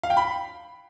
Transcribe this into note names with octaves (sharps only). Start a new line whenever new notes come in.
F5
G5
B5